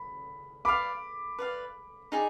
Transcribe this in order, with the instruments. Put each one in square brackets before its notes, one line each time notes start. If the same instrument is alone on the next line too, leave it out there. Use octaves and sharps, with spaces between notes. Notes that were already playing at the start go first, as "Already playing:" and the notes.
Already playing: [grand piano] B5
[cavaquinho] B4 D5 F5 [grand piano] B5 D6
[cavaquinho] B4 D5 F5
D#4 G#4 D5 G#5